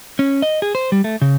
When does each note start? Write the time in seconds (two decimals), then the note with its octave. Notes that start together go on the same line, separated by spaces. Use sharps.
0.19 C#4
0.42 D#5
0.62 G#4
0.75 C5
0.92 G3
1.04 A3
1.22 C#3